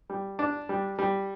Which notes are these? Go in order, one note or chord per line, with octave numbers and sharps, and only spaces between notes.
G3
D4
G3
G3